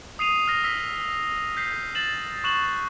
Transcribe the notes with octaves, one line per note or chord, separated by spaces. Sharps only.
D#6 C7 D#7 F7
F6 A#6
E6 B6
G6 B6 C7
A6 E7 F#7
C#6 F#6 E7 F#7